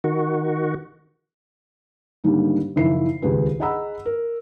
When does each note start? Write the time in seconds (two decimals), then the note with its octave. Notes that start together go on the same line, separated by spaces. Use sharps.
0.04 D#3 F#4
2.24 G#2 D3 D#3 G3 A#3
2.76 F#1 D#3 F3 E4 C7
3.22 D#1 C#2 G4 G#4 B4
3.60 G#4 D#5 F#5 A#5 B5 E6
4.06 A#4